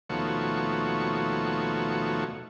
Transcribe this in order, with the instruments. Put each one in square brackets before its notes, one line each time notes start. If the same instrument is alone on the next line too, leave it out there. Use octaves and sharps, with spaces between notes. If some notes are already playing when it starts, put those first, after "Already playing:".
[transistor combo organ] D#2 B2 F3 A3 F#4 C#5